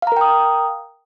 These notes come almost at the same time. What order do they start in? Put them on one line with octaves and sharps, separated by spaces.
F5 A#5 A#4 G5 D#6